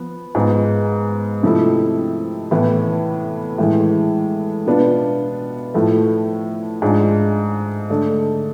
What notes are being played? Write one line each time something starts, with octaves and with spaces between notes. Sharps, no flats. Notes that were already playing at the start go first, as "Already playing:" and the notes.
Already playing: F3 B3
G#2 G#3 B3 F4
C3 F3 A3 E4
A2 E3 B3
A2 E3 G#3
B2 B3 D4 F4
A2 F3 A3
G#2 G#3 D4 F4
D3 A3 D4